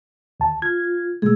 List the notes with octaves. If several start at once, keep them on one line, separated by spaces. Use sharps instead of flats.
D#2 A5
F4 G#6
B2 G#3 A3 G#4 E6